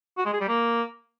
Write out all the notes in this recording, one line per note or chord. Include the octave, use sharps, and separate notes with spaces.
F#4
G#3
G#4
G3
A#3